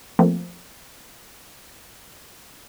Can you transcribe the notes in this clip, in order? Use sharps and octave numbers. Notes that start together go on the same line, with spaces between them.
F3 A3 A#3 C4